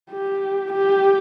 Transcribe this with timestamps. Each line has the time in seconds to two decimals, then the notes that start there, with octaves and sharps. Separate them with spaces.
0.11 G4
0.72 G4